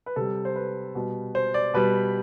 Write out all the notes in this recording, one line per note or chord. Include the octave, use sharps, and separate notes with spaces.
B4
C3 G3 A4
C5
B4
B2 G3
C5
D5
B2 G3 B4